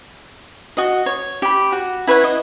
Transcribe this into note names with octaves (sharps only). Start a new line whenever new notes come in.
F#4 D#5
C#5
G4 B5
F#4
E4 B4 C#5 F#5
D#5